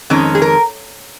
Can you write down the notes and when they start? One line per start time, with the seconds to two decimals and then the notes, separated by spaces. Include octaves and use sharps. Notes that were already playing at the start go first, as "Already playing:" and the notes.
0.10 F2 D#3 G#3 C#4
0.35 G#4
0.42 A#4